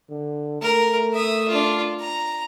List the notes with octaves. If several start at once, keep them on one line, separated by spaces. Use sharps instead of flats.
D3
A3 A#4
E5 D#6
D4 F4
A#5